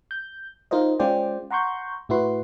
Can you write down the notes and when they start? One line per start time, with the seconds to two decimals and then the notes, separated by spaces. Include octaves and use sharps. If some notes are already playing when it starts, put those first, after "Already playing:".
0.11 G6
0.71 D#4 F4 A#4 C5 D#5
0.99 G#3 C#4 F4 C5 D5 G5
1.51 F#5 A#5 C6 C#6 G6
2.09 A2 E4 F#4 B4 C6